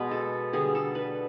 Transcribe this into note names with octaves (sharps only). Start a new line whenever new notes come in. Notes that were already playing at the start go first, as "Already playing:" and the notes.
Already playing: B2 G#3 B3 B4
A4
D3 G3 B3 G#4
A4
B4